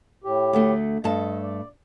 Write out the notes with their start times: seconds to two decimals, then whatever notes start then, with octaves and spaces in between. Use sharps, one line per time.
0.24 A2 G4
0.53 D2 D3 A3
1.04 G2 A3 D#5 A5
1.42 D5